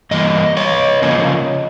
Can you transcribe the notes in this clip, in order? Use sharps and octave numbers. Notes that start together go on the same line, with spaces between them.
G2 E3 A#3 D#5
C#5 D#5
C#3 F3 A#3 C#4